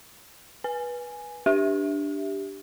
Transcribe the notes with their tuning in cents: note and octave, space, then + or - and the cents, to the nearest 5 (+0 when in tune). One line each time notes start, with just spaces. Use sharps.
B4 -20 G#5 +0
D4 +0 G4 +0 E5 +0